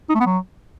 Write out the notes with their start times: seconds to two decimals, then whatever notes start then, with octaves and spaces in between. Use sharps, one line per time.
0.09 D#4
0.15 A3
0.20 B3
0.26 F#3